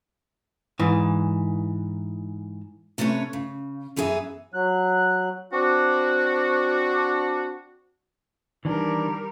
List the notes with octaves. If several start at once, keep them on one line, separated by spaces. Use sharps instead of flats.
G#2 E3
C3 A3 C#4 B4 C#5
C#3
F#2 E3 B3 G#4 A4 E5
F#3 F#6
C4 D4 F#4
D#3 E3 G3 D4 A#4